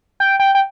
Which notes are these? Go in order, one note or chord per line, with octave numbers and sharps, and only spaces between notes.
G5
G5
G5